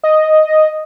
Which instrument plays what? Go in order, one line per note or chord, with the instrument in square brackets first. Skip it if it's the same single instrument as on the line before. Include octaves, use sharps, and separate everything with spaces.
[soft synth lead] D#5